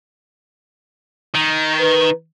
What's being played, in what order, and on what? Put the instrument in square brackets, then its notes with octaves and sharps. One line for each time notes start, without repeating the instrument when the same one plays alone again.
[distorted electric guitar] D#3
[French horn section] B4